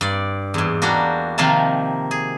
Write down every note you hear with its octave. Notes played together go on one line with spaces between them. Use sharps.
G2 D5
E2 G#2
G3 A#3 D4 F#4
C3 D#3 F3 A#3 F5 A5
G#4